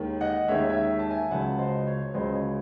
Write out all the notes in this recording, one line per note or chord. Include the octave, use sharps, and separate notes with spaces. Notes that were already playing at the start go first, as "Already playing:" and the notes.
Already playing: D#2 D#3 G#3
D#5 F#5
D#2 D#3 G#3 C#5 E5
C#5 E5
A5
E5 G#5
C#2 C#3 F#3 F#5 A5
C5 D#5
C#5
C#2 C#3 F#3 C5 D#5
C#5